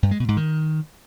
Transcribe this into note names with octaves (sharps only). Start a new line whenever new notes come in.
G2
G#3
B2
G#2
D#3